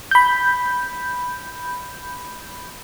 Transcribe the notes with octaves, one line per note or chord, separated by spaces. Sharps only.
B5 G6